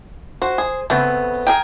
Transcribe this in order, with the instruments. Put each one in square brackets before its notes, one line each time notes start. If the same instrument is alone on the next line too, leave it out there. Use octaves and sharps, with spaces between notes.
[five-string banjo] F#4 [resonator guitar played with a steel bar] C5
[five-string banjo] G#4
[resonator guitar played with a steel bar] C#3 B3 C4 [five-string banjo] A3
[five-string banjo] G#4 A#4 G5